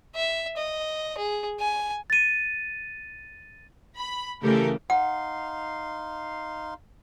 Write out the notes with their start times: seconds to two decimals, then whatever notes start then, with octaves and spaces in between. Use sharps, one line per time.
0.15 E5
0.57 D#5
1.18 G#4
1.60 G#5
2.10 A6 D#7
3.97 B5
4.43 C#3 E3 A3 G4 A4 A#4
4.90 D#4 F5 F#5 C6